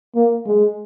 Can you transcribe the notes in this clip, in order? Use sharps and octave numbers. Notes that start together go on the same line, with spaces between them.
A#3
G#3